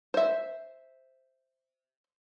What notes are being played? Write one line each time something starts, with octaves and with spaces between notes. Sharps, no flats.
C5 E5